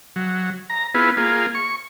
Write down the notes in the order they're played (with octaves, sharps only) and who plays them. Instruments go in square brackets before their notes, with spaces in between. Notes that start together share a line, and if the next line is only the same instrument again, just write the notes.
[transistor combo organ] F#3
A#5
B3 E4 F4 G#4 B4
A#3 F4 G#4
C#6